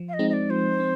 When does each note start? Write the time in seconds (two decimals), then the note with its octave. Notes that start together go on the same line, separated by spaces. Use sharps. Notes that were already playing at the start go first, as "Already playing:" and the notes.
Already playing: F3
0.09 F5
0.14 D#5
0.19 G#3 C4 D#4
0.29 D#5
0.33 D5
0.50 F3 C5
0.80 C4